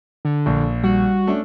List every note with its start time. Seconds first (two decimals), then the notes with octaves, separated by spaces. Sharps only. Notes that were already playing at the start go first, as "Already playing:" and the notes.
0.25 D3
0.46 A#1
0.84 G3 F#4
1.27 A3 C#4 D4